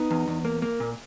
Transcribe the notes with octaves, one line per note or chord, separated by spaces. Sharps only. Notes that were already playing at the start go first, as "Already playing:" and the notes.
Already playing: B3 D#4
E2
E2
A#3
A#3
A#2